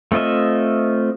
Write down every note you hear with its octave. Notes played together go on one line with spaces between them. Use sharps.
A3 C4 F4 D#5 E5